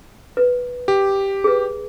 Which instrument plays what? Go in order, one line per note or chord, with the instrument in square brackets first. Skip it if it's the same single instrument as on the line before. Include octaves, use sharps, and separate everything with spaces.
[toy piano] B4
[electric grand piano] G4
[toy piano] G#4 B4